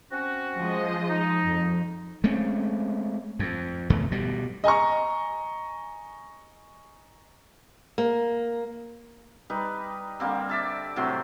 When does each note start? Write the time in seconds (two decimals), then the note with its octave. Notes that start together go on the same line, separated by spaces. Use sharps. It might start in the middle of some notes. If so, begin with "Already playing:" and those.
0.11 C4 C#4 F#4
0.58 F3 G#3 D#5
1.09 D#4
1.45 F2
2.24 G#3 A3 C4 C#4
3.39 F2
3.90 F1 E2 D#3 A3
4.11 B2 G3
4.64 D#5 G#5 A#5 C#6
7.98 A#3
9.50 G3 D#4 B4
10.20 D3 G3 A#3 C4
10.49 D5 E5 A5
10.96 A2 C3 F#3 C6